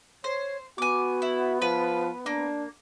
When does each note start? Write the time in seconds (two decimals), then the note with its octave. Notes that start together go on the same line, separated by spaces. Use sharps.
0.24 C5 C#5
0.78 B3 F#4 G#5 D6
1.22 E4
1.62 F3 B4
2.26 A#3 D4